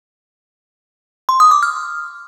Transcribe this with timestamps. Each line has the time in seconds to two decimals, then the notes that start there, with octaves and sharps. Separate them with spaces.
1.29 C6
1.40 D#6
1.51 D6
1.63 F6